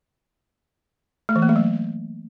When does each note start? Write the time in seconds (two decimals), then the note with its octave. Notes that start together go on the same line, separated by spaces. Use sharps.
1.29 A3
1.36 E3
1.42 A#3
1.49 A3
1.56 F#3